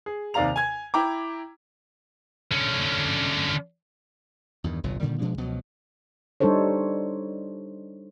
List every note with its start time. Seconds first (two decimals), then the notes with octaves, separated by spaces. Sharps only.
0.06 G#4
0.34 D#2 C3 D5 F5 A#5 F7
0.56 G#5 G#6
0.94 E4 G5 A#5 D6
2.52 D3 C#4
4.64 E2 G2 D#3
4.83 G1 C2 A#2 F#3
5.00 A#2 D3 D#3 G3
5.20 B2 F3 G#3 D4
5.37 C#2 B2 F3 F#3
6.40 G3 D4 D#4 A4 C5 C#5